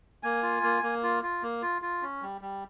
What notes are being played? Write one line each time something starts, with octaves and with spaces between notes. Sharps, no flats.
A#3 G#5
F4
A#3
A#3
F4
F4
A#3
F4
F4
C#4
G3
G3